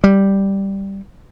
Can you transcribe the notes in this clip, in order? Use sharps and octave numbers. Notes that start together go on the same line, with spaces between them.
G3